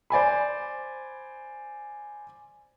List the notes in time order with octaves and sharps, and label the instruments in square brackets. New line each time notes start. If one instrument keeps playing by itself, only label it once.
[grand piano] C5 D5 G#5 B5